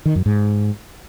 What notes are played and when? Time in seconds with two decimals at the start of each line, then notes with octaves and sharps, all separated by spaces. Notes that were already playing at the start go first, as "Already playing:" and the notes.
0.06 D#3
0.16 F#2
0.26 G#2